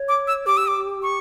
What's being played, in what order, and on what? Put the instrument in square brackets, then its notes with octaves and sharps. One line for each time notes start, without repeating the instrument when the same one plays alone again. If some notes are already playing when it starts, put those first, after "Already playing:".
Already playing: [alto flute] C#5
[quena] D6
E6
[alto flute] G4 [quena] D6
[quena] E6
D6
C#6